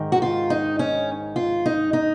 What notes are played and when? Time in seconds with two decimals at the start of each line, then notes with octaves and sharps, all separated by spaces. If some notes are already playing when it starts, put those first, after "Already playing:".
Already playing: G#2 D#3
0.12 F#4
0.22 F4
0.50 D#4
0.79 C#4
1.36 F4
1.66 D#4
1.93 D#4